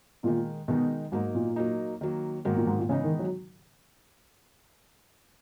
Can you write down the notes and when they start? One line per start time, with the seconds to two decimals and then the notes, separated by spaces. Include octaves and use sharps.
0.23 A#2 D#3 G#3 D#4
0.68 B2 D#3 G#3 D#4
1.12 G#2 F#3 A#3 D#4
1.35 A#2
1.56 F#3 A#3 D#4
2.01 D#3 F#3 A#3
2.45 G#2 D#3 F#3 A#3
2.57 A#2
2.67 G#2
2.78 A#2
2.89 C#3 E3 G#3 B3 D#4
3.04 D#3
3.19 F#3